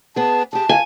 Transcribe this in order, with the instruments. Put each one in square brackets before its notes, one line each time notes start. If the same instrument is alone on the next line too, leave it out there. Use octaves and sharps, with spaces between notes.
[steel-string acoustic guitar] B3 G#4 [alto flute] A5
[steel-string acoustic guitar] G4 G#4 [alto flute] A5
[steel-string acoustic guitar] F4 [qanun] G#5